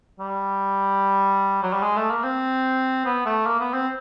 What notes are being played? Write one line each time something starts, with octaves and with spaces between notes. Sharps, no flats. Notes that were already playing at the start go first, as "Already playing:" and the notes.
G3
F#3
G3
G#3
A3
A#3
C4
B3
A3
A#3
B3
C4